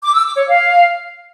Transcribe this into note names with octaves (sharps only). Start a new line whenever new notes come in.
D6
E6
D6
C#5
F5